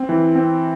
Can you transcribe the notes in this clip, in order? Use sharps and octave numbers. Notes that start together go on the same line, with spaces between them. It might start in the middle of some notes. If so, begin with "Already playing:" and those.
Already playing: C4
E3
C4